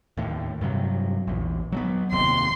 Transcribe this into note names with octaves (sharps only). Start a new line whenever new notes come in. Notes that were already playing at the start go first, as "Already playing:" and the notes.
D#2 A2
G2 C3 F#3
A#1 E2
F#3 G#3 B3
F1 D#2 C3 C6